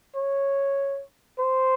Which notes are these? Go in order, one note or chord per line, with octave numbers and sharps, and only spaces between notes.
C#5
C5